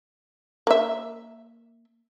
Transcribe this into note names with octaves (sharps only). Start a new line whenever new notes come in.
A#3 E5